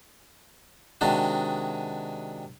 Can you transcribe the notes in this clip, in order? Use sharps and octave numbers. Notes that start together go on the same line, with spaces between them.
C3 D#3 G#3 D4 F#4